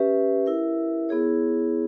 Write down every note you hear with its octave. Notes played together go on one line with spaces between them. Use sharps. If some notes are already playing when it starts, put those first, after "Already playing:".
Already playing: C#4 G4 B4 E5
E4 A#4 E5
B3 E4 G#4 C#5